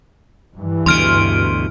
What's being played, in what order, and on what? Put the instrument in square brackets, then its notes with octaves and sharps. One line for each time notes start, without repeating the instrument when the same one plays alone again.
[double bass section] G2 E3
[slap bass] D2 B2 [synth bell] C6 F6 D7